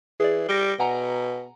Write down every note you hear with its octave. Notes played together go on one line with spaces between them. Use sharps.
E3 G#4 D5
G3 A#6 D7 G7
B2 F#5 G#5 A#5